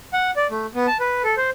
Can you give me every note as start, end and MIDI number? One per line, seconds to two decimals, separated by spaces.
0.13 0.31 78
0.36 0.47 74
0.51 0.67 57
0.75 0.87 59
0.87 0.97 81
1.00 1.22 71
1.24 1.35 69
1.37 1.50 72